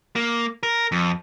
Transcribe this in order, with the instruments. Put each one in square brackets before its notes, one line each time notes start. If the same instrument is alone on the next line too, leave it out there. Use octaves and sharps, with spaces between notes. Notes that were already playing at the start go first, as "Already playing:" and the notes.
[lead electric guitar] A#3
A#4
F2